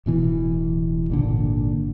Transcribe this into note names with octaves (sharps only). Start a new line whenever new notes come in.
D1 B2 E3
G#1 A#2 D3